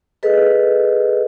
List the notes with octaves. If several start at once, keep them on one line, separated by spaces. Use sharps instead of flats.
G#4 A4 B4 D#5